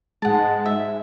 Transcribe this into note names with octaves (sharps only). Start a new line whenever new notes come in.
G#2 G#3 F#5 A5
E5